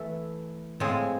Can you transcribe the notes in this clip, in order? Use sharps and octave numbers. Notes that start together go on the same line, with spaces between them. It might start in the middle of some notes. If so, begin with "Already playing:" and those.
Already playing: E3 A3 E4 A4
A2 F3 G#3 C4 G#4